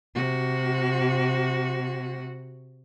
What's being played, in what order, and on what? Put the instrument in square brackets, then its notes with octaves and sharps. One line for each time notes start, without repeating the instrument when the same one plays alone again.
[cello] C3 F#4